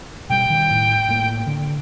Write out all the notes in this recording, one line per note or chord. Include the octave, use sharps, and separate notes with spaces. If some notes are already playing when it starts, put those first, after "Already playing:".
B2 G3 G5
D#3 G3
A2
A2 A#3
D3